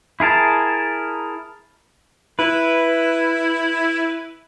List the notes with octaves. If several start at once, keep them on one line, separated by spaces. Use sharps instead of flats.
E4 G#4 A#4 A5
E4 B4